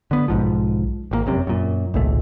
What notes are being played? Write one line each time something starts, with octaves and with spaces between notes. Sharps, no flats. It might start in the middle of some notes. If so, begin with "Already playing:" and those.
D3 B3
B1 G#2 F3
G#1 D#3 A#3
F1 F#2 C3
F#2 A#2
G#1 C#2 A#2 A3